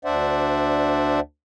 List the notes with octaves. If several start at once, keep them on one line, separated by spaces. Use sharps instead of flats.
D2 D4 C5 D5 E5 F#5